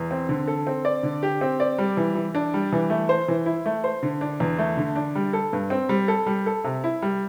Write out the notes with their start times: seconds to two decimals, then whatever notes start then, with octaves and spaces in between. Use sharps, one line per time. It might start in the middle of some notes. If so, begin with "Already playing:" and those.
Already playing: E2
0.11 C4
0.29 D3
0.47 A4
0.67 C4
0.85 D5
1.03 D3
1.23 G4
1.41 C4
1.60 D5
1.78 G3
1.97 E3
2.15 E3
2.35 D4
2.54 G3
2.72 E3
2.90 A3
3.09 C5
3.28 E3
3.46 E4
3.66 A3
3.84 C5
4.03 D3
4.21 D4
4.40 E2
4.59 A3
4.77 D3
4.96 D4
5.15 G3
5.33 A4
5.53 G2
5.70 C4
5.89 G3
6.08 A4
6.26 G3
6.46 A4
6.64 C3
6.84 E4
7.02 G3